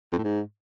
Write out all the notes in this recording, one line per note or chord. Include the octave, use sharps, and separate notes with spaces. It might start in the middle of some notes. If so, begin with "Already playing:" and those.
F2
A2
G#2